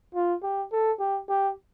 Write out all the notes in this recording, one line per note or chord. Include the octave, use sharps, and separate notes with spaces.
F4
G4
A4
G4
G4